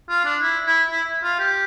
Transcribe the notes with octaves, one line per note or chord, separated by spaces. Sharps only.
F4
D4
E4
E4
E4
F4
G4